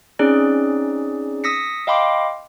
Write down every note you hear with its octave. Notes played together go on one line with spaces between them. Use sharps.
C4 C#4 D#4 G#4 D5
D#6 E6 A#6 B6 C#7
D#5 F5 G5 B5 C6 D6